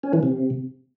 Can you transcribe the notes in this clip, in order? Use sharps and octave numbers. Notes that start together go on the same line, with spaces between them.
C#4
E3
C3